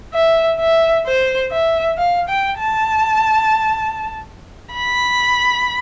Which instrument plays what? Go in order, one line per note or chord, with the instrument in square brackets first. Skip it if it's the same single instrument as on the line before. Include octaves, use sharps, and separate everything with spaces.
[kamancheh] E5
E5
C5
E5
F5
G5
A5
B5